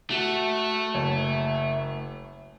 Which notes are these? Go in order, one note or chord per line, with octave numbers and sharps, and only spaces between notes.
A3 F#4
F#1 C#5